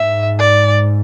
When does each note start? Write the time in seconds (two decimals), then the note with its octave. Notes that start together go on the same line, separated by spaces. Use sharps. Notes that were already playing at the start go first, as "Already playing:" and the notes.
Already playing: G#2 E5
0.39 D5